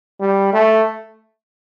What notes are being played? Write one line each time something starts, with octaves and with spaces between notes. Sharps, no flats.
G3
A3